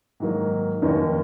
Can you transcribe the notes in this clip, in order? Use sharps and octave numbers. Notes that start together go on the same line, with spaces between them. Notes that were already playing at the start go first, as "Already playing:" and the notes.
G#2 D#3 F#3 A#3
F1 D#2 D#3 A#3 C#4